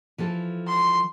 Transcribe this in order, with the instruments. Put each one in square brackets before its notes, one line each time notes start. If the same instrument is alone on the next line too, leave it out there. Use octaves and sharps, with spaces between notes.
[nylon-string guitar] E3 F3 A4
[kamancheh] C6